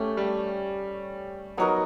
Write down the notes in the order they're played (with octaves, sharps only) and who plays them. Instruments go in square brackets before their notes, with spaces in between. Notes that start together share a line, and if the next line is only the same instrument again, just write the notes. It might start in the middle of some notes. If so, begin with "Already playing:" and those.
Already playing: [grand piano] A3 [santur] C#4 G4
[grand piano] G3
[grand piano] F#3 [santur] B3 D#4 F#4 A#4